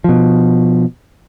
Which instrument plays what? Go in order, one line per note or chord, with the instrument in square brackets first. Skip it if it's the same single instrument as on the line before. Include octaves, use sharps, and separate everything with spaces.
[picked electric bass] B2 F3